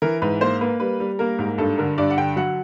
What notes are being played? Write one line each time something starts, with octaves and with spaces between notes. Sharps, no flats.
E3 A#4
G#2 B4
A#3 C5
A#3 B4
G3 B4
G3
A#3 A#4
G#2
G2 A4
D3 A#4
G2 D5
F#5
D3 G5
F#3 F#5